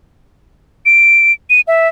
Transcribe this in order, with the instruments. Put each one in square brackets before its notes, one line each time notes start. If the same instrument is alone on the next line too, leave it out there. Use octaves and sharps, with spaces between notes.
[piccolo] D7
D#7
E5